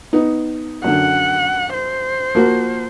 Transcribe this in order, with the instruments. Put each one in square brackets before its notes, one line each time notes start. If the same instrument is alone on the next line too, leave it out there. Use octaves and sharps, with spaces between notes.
[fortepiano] B3 D#4
[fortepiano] F#2 D3 [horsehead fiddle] F#5
[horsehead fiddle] C5
[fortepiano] F3 A#3 F#4